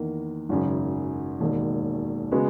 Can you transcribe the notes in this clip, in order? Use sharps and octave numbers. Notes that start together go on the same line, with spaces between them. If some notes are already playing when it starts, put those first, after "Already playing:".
Already playing: E2 D#3 A#3
G#1 F#2 C#3
E1 D#2 D#3
C#3 G#3 B3 F#4